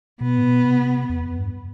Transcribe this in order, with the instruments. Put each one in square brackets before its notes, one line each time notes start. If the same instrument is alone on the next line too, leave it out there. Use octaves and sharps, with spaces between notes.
[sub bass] B2 [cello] B3
[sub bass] A2
B2
C3
E2
F2
G2